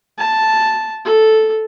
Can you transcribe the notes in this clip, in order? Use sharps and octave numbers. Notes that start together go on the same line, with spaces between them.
A5
A4